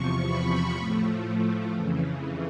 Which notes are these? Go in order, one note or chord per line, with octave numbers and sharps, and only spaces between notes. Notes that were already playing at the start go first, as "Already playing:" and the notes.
Already playing: E2 C3 F3 C#6
B5
A2 F3 A3
F2 C#3 E3